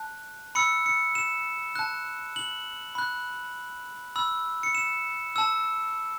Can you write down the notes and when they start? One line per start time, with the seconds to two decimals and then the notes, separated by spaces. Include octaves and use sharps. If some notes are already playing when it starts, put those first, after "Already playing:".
Already playing: A5 F#6
0.55 B5 E6 C#7
0.86 C#7
1.15 E7
1.75 A5 F#6
2.36 F#7
2.95 B5 F#6
4.16 B5 E6
4.63 C#7
4.75 E7
5.36 A5 E6